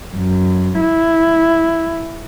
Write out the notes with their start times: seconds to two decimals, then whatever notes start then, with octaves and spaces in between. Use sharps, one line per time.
0.16 F#2
0.80 E4